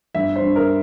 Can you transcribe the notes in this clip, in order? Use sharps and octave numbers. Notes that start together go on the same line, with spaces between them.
G1 E5
C5
G2
A#4